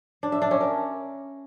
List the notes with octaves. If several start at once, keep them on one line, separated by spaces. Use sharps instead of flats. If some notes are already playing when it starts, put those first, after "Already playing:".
D4
E5
D4
C#4
A#4